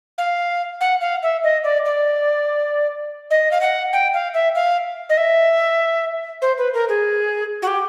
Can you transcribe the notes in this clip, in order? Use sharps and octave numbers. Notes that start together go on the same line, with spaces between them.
F5
F#5
F5
E5
D#5
D5
D5
D#5
F5
F#5
G5
F5
E5
F5
D#5
E5
C5
B4
A#4
G#4
F#4
G4